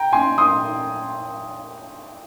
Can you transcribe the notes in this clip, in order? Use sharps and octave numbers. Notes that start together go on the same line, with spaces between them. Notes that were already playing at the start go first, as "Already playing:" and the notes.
Already playing: G5 A#5
G#5 C6
C6 D#6